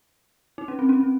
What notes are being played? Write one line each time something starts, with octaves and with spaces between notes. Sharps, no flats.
D#4
C#4
C4
C#4
C4